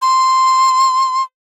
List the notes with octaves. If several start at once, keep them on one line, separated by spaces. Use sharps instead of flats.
C6